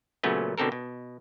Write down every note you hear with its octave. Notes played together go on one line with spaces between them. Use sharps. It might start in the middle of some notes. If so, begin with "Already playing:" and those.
A#2 C#3 F#3 A3 B3 C#4
B2 D3 C4 A4 A#4
B2